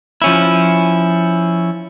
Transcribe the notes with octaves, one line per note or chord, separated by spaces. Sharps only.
F3 C#4 E4